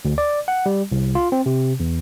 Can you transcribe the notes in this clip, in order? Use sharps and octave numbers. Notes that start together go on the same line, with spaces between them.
D2
D5
F#5
G3
C2
F4
C4
C3
E2